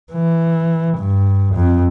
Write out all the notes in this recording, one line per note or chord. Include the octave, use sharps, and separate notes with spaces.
E3
G2
F2